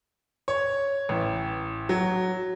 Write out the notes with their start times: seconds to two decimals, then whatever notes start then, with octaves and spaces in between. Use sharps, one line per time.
0.48 C#5
1.09 A1
1.89 F#3